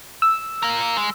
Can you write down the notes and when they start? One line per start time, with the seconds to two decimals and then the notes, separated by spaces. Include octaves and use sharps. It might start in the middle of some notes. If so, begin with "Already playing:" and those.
0.22 E6
0.63 F4 A#4
0.97 G#3